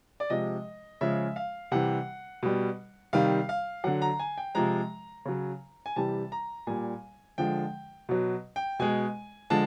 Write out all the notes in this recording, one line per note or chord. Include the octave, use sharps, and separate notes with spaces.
D5
C3 F3 G#3 D#5
C#3 F3 G#3 E5
F5
C3 E3 G3 F#5
B2 G3
C3 D#3 G3 F5
F5
D3 F#3 F#5
A#5
G#5
G5
C3 F3 G#3 A#5
C#3 F#3
G#5
C3 E3 G3 A5
A#5
A#2 G3 G#5
D3 F3 G#3 G5
B2 F#3
G5
B2 G#3 G#5
D3 F3 G#3 A5